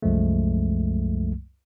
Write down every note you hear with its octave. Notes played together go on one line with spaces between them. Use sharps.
C2 F#2 F3 G#3 A3